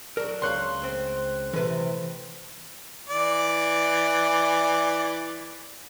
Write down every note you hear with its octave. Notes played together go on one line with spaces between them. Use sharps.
F#3 D4 A#4
C#2 C#5 F5 C6 F#6
C4 C#4
C3 E3 A3 B4
E3 D5